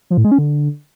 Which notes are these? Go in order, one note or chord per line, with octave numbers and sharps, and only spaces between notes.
F3
A2
G#3
C#4
D3